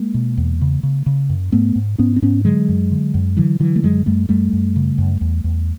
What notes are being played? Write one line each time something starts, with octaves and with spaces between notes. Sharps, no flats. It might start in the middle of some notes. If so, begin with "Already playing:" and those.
Already playing: G#3 A#3
B2
E2
C#3
C#3
C#3
F#2
G#2 A3 B3
G#2
G#2 B3 C#4
C4
G#2 B3 C#4
D3 F#3 G#3
F#2
D3
F#2
D3 E3 F#3
D3 E3 F#3
A3
F#2 F#3 G#3
F#2 G3 A3
F#2 G3 A3
F#2
C#3
F#2
E2
E2